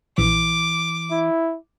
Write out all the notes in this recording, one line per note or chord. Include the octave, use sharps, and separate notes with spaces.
A#1 E3 D6
E4